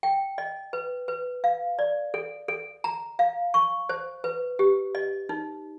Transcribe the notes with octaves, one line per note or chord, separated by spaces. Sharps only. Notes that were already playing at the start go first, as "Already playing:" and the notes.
G5
D#5
B4
B4
F5
D5
A4
A4
A#5
F5
C#6
C5
B4
G4
D#5
D#4